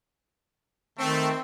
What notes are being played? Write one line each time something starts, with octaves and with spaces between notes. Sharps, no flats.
D#3 A3 C4